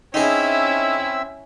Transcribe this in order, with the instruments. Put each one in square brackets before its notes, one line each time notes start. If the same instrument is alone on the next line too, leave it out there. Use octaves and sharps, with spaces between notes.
[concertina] C4 E5 E6 [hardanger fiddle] C#4 E4 [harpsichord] D#4 G#4